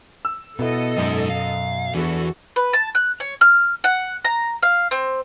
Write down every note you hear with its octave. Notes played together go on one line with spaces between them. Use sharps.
E6
B2 B3 E4 A4 D#5
F#2 G#3 D#4
F5
E2 E3 D4 F#4 A4
B4
A5
F#6
C#5
F6
F#5
A#5
F5
C4